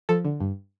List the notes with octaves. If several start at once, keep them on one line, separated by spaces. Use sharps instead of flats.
F3 A4
D3
G2